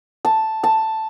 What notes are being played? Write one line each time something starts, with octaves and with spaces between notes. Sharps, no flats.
A5
A5